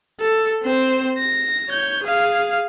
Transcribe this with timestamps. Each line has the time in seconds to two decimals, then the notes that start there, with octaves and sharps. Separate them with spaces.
0.20 A4
0.63 C4 C5
1.18 A#6
1.69 C#5 G6
2.04 G#4 F5